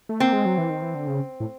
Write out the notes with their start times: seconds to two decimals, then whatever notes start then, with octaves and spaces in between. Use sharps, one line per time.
0.09 A3
0.20 A#3 C4
0.33 G#3
0.45 F#3
0.58 E3
0.70 D#3
0.82 E3
0.95 D3
1.07 C#3
1.40 A2